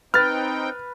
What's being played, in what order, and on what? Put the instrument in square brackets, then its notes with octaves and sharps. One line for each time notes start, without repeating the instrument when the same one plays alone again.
[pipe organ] C4 D#4 G5 [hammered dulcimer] B4 [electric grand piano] F6 A6